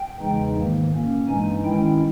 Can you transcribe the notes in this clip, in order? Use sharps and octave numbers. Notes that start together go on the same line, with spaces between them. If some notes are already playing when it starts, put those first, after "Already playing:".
Already playing: G5
E2 C#3 E3 G#3 D#4
G#2 D#3 A#3
A#2 A#3 C#4
G2 E3 G#3 D#4 G#5
D#3 G#3 C#4 E4 G5